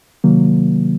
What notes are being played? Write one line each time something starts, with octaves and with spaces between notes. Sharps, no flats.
C3 D#3 F#3 A#3